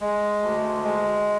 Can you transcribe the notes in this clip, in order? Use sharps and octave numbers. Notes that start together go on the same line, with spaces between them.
G#3
D2
G#3